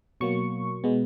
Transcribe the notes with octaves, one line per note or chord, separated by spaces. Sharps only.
B2 F#3 A#3 C#6
B2 G#3 B3